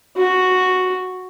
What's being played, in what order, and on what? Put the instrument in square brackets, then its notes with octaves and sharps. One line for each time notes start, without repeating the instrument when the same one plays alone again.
[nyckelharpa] F#4